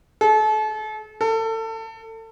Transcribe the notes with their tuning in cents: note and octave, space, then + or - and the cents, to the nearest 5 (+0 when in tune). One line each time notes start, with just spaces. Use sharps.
A4 -35
A4 +30